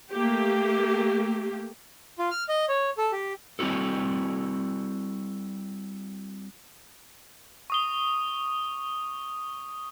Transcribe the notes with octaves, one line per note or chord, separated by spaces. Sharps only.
A3 A#3 G4
F4
F6
D#5
C#5
A4
G4
G3 C4 E4 F#4 A4
C#6 D#6 G7